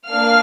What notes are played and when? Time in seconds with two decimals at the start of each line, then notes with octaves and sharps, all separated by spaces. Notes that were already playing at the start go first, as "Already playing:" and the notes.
0.11 A#3 D4 F5 F6